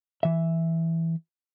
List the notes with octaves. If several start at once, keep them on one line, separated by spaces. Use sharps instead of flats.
E3 E5